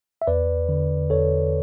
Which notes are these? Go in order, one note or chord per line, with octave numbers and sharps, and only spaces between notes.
E5
E2 B4 D5
D3
E2 A4 C#5